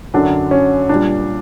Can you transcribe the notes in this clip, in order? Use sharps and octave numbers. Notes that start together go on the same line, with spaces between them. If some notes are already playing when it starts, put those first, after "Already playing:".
F#2 D3 F#3 D4
C#4
A#2 G3 D4